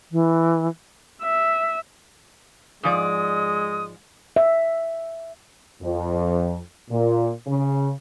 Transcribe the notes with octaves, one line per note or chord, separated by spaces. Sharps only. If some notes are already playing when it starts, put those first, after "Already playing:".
E3
E5
G#2 F3 G#3 D5 D#6
E5
F2
A#2
C#3